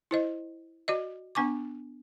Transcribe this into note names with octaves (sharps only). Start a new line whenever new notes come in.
E4 C5 D#5
F#4 D5 D#5
B3 D4 G#5 C#6 D6